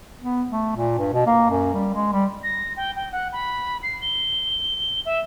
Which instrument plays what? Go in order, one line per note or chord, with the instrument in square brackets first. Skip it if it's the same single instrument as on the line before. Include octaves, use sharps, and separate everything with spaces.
[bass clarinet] B3
A3
A#2
G2
B2
A#3
F#2
G3
G#3
G3
[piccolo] A#6
G5
G5
F#5
B5
C7
G7
E5